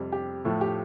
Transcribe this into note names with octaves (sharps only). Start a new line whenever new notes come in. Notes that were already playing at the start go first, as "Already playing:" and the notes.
Already playing: F2 C3 G3 C4
G4
A2 F3 A3 A4
G4